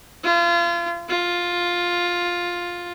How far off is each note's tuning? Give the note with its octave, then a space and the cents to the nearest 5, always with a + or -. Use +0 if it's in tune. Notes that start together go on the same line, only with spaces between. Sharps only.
F4 -30
F4 +10